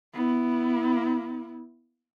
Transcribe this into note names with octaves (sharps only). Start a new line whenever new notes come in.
B3 E4